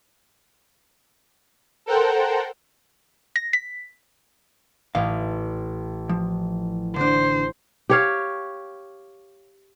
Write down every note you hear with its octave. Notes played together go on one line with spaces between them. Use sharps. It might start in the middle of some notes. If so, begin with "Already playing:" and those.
A4 A#4 C5 F#5 G5
A#6
B6
A1 A2 F5
F3
D3 D4 C5
G4 C#5 F5